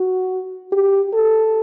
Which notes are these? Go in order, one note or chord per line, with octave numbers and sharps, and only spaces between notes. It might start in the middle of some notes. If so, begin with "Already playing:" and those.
Already playing: F#4
G4
A4